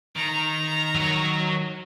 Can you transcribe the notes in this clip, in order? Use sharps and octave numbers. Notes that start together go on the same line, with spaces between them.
D#3 A#5
F#3 C#5